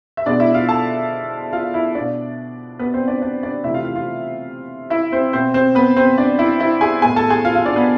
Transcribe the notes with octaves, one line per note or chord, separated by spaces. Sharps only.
E5
B2 G#3 B3 D4 D5
E4 E5
F4 F5
A4 A5
F4 F5
E4 E5
B2 B3 D4 D5
B3 B4
C4 C5
D4 D5
D4 D5
D4 D5
C3 E3 A3 E4 E5
F4 F5
F4 F5
F4 F5
E4 E5
C4 C5
B2 B3 C4 C5
C4 C5
B3 B4
C4 C5
D4 D5
E4 E5
E4 E5
G#4 G#5
A2 G#3 B3 G#4 G#5
A4 A5
G#4 G#5
F4 F5
F4 F5
D4 D5
B3 B4